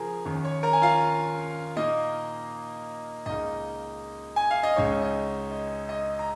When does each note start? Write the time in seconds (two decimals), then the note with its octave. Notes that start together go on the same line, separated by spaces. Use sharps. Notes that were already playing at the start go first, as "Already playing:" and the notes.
Already playing: C#3 F3 G#4 A#4 G#5 A#5
0.25 D#2 D#3 C#4
0.45 C#5 C#6
0.63 A#4 A#5
0.73 G#5
0.82 F4 F5
1.76 A#2 A#3 D#4 D#5
3.26 C#2 C#3 A#3 D#4 D#5
4.36 G#5
4.51 F5
4.63 D#5
4.76 C#2 C#3 G#3 D#4 C#5
5.02 D#5
5.51 D#5
5.89 D#5
6.19 A#5